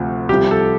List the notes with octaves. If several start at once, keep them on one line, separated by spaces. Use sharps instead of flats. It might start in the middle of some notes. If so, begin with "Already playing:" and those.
Already playing: D2 C3 F3
C2 C3 F3 G4
A4